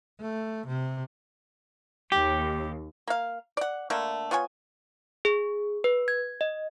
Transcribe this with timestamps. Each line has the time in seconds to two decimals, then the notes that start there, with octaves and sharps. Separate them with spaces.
0.20 A3
0.68 C3
2.12 D#2 G4
3.08 A#3 F5
3.57 D5 F#5
3.90 D3 A3 A#3 D4
4.31 B3 F4 C#5 G#5
5.25 G#4
5.84 B4
6.08 G#6
6.41 D#5